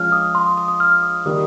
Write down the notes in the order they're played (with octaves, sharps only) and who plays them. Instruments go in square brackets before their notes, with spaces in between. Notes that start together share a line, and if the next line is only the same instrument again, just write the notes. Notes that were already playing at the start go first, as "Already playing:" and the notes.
Already playing: [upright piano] F3 G#3 C#4 F4 [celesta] F6
[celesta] D#6
C6
D#6
D#6
D#6
F6
D#6
[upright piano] D#3 G3 A#3 [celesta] D#6